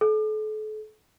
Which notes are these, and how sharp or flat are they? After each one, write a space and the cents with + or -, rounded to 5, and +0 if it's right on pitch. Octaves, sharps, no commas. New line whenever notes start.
A4 -40